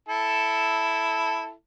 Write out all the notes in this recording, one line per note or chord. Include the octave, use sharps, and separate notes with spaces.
E4 A4